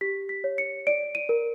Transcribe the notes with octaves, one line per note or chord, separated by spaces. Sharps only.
G4 B6
B6
C#5
C#7
D5 D7
D#7
A#4